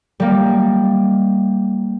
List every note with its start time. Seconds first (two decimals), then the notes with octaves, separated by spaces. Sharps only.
0.20 G3 A#3